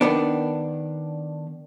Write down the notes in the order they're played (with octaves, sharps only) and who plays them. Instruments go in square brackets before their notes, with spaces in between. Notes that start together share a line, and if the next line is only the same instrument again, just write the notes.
[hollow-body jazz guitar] D#3 B3 D4